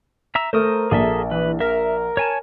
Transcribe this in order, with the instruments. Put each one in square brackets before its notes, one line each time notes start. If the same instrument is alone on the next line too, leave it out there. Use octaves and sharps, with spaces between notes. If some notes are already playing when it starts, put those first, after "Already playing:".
[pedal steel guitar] E5 A#5 E6
[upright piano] A3 [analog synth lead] A#4 [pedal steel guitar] C5 D#6
[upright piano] A#1 [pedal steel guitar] G#4 A4 E5
[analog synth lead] E3 [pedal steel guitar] B4
[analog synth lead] A#4 [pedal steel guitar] E5
[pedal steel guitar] C#5 G#5 A5